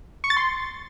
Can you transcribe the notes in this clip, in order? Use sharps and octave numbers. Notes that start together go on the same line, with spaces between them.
C#6
A6
C6